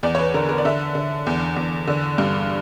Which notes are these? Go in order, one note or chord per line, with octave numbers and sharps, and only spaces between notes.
E2 D5
C#5
B4
D3 A#4
A#4
D5
D3 E5
D3
E2
E2
D3
G2